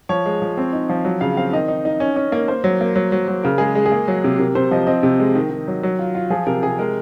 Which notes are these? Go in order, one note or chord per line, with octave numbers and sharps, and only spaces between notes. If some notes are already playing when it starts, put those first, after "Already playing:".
F3 C#5
G#3
F3
C4
D#4
F3
F#3
C#3 F5
C4 F5
D#3 D#5
D#4
D#4
C#4
C#4
A#3
A#3 C5
F#3
A#3
F#3
F#3
F#3
C#3 A#4
G#3 G#4
G#3
G#4
A#3
F#3
C3
C3 A#4
C3 C5
F3 D#5
C4 D#5
C3
G#3
D#3
D#3
F#3
F#3
F4
F4
F3 G#4
C3 A#4
C3 G#4
G#3 A#4